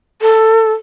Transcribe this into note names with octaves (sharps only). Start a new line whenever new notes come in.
A4